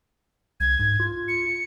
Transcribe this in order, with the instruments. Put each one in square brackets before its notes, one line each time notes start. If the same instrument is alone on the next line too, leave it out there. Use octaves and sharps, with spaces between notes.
[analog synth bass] C2 [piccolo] G#6
[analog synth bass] G#2
F4
[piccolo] C#7